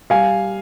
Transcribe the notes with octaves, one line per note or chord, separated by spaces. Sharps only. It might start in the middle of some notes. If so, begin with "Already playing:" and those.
G3 F5 G#5